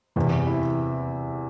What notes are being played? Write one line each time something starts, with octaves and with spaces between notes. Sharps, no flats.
E2 C3 E3
E4